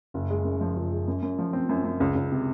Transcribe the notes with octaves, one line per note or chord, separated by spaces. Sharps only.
F#1
G#3
F#2
F3
F#1
G#3
F#2
F#2
F3
C4
F#2
F#2
C#2
C#2
C3